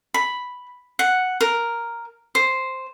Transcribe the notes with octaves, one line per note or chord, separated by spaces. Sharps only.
B5
F#5
A#4
C5